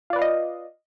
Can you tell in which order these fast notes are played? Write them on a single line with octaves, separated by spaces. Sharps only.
F4 D5 B4 F5 D#5